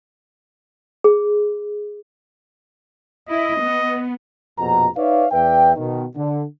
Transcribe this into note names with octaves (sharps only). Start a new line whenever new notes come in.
G#4
E4 D#5
B3
A#1 F2 B2 A#5
D#4 B4 C#5 D5 E5 F5
E2 B4 D5 E5 G5
B2 D#3
D3